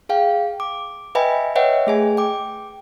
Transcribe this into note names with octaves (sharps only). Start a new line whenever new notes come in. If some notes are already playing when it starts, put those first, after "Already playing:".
G#4 F5 G5
D6
B4 D#5 E5 G5 G#5 B5
B4 C#5 D#5 E5 F#5 G5
A3 G#4 G#5
G5 D6